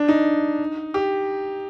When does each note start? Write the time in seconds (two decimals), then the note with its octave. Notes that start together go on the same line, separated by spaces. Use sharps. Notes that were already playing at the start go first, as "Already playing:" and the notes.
Already playing: D4
0.08 D#4
0.94 G4